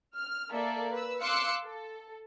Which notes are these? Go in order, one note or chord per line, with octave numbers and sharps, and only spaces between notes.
F6
A#3 A4 D5 E5
B4 E6
F5 C6 D6 E6 F#6 C#7
A4